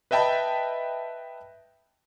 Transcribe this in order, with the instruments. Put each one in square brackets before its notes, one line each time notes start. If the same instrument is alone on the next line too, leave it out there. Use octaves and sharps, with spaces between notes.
[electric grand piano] B4 D#5 E5 G5 A5 B5